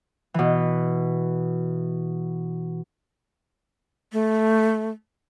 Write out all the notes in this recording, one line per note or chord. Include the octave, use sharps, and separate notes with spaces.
B2 E3
A3